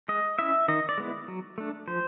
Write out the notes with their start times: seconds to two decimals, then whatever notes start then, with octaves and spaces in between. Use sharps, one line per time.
0.08 G#3 D#5
0.39 C#4 E4 E5
0.68 D#3 D#5
0.89 D5
0.98 G#3 B3 E4
1.28 F#3
1.58 A3 D4
1.88 F3 C5